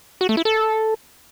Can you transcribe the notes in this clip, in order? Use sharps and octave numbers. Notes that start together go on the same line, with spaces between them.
F#4
A3
E4
A4